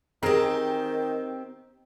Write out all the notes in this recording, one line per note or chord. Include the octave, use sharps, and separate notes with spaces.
D#3 C4 G4 G#4 A#4 A#5